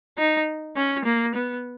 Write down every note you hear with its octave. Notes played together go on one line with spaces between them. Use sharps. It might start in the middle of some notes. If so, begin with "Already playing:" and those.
D#4
C#4
A#3
B3